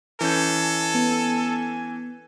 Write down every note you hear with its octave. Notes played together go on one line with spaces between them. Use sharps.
E3 C#4 A4 G#5 G6
B3